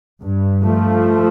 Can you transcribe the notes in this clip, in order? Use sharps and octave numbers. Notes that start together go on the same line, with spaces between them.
G2
F3 A3